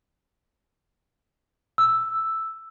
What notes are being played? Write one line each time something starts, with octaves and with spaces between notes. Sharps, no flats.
E6